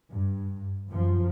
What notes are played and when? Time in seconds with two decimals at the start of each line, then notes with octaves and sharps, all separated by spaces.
0.12 G2
0.89 F#2 F3